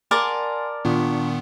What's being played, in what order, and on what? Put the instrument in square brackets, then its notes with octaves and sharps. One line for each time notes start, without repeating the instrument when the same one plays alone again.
[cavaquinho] A#4 D5 A5 [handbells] F#5 G#5 C6
[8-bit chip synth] A#2 D#3 B3 [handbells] D4 F4 C#6